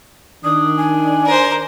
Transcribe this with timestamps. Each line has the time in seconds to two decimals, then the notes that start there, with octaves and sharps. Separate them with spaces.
0.44 D#3 D4 D#6
0.77 G#5
1.26 A#4 C5